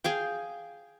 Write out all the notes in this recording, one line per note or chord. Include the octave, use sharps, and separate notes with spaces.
G#4 F5 G5